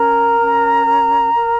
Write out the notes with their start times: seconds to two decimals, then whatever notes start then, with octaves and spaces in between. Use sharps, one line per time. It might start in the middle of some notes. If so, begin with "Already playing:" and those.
Already playing: C#4 A#4 A#5
0.40 C#4
0.86 A#4
1.34 A#4